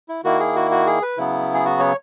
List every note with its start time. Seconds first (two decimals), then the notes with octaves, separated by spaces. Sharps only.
0.09 E4
0.24 D#3 A#3 E4 F#4
0.39 G#4
0.56 F#4
0.71 F#4
0.86 G#4
1.02 B4
1.18 C#3 F#3 B3 E4
1.54 G#4
1.65 F#4
1.80 C#5